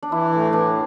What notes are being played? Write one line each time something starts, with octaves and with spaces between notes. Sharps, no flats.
D4
E3 E4
A2
E3 D4